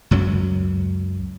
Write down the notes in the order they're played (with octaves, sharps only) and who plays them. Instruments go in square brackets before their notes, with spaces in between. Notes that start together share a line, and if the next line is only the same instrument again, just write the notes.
[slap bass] C#2 F#2 F#3